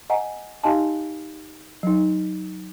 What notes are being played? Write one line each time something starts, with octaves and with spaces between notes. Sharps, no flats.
D#5 F#5 G#5 A#5
D#4 G4 D#5 F5 G#5 A5
F#3 D#4